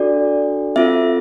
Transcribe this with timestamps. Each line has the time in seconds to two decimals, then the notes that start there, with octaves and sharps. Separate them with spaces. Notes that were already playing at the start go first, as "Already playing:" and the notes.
Already playing: D4 F#4 A4 D5
0.76 C4 F4 A4 E5